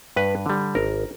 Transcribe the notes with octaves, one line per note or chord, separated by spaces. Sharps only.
G2 B4
D3 G3
G#1 A#4